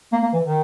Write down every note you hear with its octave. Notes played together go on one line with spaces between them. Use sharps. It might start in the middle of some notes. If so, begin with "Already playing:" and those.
A#3
A#3
E3
D#3